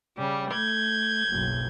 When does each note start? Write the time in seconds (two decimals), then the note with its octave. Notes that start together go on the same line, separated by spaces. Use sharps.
0.18 C#3 G3 G4
0.51 A3 G6 G#6
1.29 F#1 B1